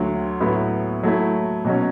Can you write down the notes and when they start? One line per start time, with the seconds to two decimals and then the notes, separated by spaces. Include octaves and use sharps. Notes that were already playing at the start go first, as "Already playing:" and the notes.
Already playing: D2 D3 F#3
0.40 A2 F#3 B3 E4
1.03 F#3 A3 E4
1.65 B2 F#3 C#4